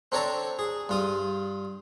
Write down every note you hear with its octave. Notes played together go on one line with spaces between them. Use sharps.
C4 D4 A4 C#5 D5 A#5
G#4
G2 F4 D#6